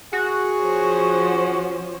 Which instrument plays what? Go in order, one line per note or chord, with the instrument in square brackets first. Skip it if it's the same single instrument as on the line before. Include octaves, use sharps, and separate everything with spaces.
[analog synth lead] F#4 [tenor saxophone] G#4
[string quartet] F3 C#4 C5